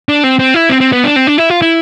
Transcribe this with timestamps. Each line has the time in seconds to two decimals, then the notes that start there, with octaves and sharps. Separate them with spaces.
0.09 D4
0.24 C4
0.39 C4
0.54 E4
0.69 C4
0.81 C4
0.93 B3
1.04 D4
1.16 C4
1.27 D4
1.38 E4
1.50 F4
1.62 E4